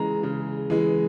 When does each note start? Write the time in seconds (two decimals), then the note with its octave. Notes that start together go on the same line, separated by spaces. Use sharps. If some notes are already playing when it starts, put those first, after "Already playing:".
Already playing: C#3 E3 G#3 A#5
0.23 C#3
0.70 E3 G#3